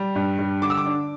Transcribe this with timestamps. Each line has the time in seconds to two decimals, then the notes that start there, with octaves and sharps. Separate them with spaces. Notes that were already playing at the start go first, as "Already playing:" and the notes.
Already playing: G3
0.16 G2
0.39 G3
0.62 D3 D6
0.70 E6
0.77 D6
0.86 D4